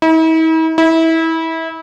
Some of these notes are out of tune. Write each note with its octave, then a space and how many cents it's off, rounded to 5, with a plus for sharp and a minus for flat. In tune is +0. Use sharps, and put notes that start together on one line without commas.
E4 -45
E4 -25